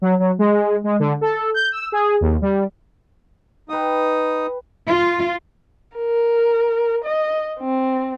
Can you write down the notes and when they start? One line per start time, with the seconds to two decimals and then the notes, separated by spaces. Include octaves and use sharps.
0.02 F#3
0.19 F#3
0.39 G#3
0.84 G#3
0.99 D3
1.21 A4
1.54 G6
1.72 E6
1.92 G#4
2.21 D#2
2.42 G3
3.69 D#4 B4 G5 D#6
4.86 F4
5.96 A#4
7.04 D#5
7.59 C4